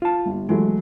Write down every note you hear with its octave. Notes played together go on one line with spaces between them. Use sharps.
F4 A5
G1
E3 F#3 G#3 A3